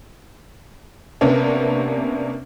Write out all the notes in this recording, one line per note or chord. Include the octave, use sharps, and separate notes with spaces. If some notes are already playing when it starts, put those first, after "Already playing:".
C3 A#3 B3 C#4 D4